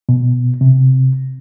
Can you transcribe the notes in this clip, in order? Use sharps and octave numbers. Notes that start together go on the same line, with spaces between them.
B2
C3